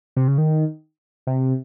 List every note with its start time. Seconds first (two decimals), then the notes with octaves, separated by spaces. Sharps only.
0.16 C3
0.28 C#3
0.38 D#3
1.27 C3